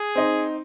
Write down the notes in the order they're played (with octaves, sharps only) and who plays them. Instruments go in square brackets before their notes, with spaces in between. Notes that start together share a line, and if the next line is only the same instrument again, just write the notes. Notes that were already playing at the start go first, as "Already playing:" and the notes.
Already playing: [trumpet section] G#4
[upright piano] C4 D#4